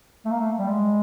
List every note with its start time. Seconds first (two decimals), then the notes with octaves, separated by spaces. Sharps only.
0.25 A3
0.31 A#3
0.40 A3
0.58 G3
0.68 G#3